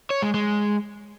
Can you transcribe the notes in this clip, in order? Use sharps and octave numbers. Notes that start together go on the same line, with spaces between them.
C#5
G#3
G#3